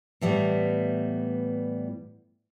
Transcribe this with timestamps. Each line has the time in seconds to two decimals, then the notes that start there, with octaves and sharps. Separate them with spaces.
0.21 A2 E3 G3 B3